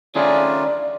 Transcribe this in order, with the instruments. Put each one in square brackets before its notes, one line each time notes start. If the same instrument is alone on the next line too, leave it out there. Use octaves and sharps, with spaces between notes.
[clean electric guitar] D#3 C#4 G#4 [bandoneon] A3 D4 F4 [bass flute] D5